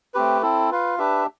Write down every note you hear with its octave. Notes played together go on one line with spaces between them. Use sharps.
A3 C4 G4 B4
C4 E4 A4
F4 B4 F5
D4 G4 B4 E5